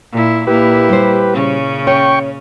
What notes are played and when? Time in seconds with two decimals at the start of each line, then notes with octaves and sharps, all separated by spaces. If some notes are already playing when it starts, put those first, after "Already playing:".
0.12 A#2 E4
0.47 A#2 A#3 E4 G4 B4
0.89 G3 C5
1.34 A#2 C#3 C#4
1.87 C#5 G5 C#6